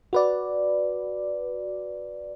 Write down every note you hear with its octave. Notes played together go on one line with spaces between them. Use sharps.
F#4 B4 D5